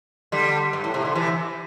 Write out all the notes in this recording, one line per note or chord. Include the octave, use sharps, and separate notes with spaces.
D3 G3
G2
A2
C3
D3
C3 E3